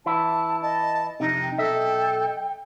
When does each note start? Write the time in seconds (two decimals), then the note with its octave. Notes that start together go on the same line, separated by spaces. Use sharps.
0.06 E3 E4 A5
0.62 D#5 A5
1.20 F2 C3 D#4
1.41 G5
1.58 B1 A4 D#5 E5